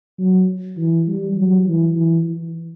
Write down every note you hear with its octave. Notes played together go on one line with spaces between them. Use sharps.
F#3
E3
G3
F#3
E3
E3